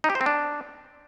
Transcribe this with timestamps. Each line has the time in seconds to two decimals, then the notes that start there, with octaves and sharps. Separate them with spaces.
0.04 D#4
0.10 G4
0.15 C5
0.21 C4
0.26 D4